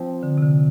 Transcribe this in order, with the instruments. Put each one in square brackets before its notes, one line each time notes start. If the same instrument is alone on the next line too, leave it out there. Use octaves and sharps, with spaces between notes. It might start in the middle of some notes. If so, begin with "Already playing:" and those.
Already playing: [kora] F3 C4
[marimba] D3
C3
D3